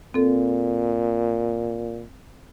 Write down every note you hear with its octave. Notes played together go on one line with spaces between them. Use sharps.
A#2 C4 A4